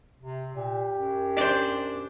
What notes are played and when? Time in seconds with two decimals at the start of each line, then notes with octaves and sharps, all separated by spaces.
0.21 C3
0.55 A#2 G4
0.95 F#2
1.37 D4 C5